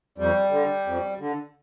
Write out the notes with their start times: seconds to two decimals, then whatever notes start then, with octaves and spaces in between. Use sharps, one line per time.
0.18 F2 G3
0.51 D3
0.86 F2
1.20 D3